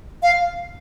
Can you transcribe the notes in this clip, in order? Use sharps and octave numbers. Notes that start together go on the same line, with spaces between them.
F5